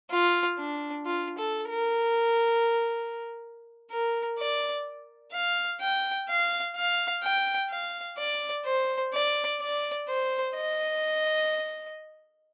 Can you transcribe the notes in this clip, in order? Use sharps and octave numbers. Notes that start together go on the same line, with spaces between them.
F4
D4
F4
A4
A#4
A#4
D5
F5
G5
F5
F5
G5
F5
D5
C5
D5
D5
C5
D#5